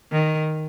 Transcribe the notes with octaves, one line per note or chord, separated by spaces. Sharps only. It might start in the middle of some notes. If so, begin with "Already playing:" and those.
D#3